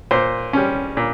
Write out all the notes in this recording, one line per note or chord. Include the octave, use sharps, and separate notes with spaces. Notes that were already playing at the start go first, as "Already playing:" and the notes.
A#2 C5
G3 C#4
A#2